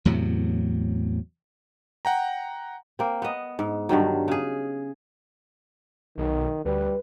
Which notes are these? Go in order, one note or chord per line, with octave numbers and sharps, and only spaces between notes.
E2 A2 C3 F#3
F#5 G5 A#5
A#3 C4
B3 D#5
G#2
G2 D3 D#3 F#3
C#3 G#4
B1 D#3
D2 G3 B4